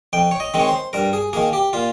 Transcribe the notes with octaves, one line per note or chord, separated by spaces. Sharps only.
F2 G5
C#5
D#5
D#3 G#3 C4
C#5
C5
G2 A#4
G#4
D#3 A#3 G#4
G4
A#2 F4